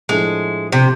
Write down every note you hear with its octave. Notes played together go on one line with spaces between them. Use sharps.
A2 F3 G#3 A3 D4
C3